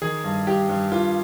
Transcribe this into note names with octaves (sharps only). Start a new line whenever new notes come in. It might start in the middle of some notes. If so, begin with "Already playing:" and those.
D#3 G#4
G2
G2 G4
G2
G2 F4